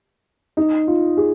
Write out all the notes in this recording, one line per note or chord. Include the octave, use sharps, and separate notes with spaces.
D#4
F4
G#4